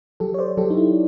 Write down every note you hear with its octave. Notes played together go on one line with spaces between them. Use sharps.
F#3 G4 A4
C#5
C5 D5
F#3 G4 A4
D#4
E4